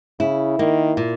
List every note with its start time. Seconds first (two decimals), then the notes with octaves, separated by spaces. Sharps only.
0.20 C#3 E4
0.58 D#3 A#3
0.97 A#2